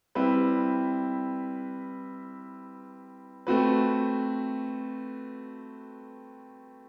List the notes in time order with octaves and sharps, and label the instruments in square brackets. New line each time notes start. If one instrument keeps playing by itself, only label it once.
[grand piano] G3 C4 E4 B4
A3 C4 F#4 B4